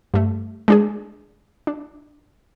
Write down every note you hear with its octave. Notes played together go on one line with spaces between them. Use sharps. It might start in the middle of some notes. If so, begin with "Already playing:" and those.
G2 A3
G#3 D4 G#4
D4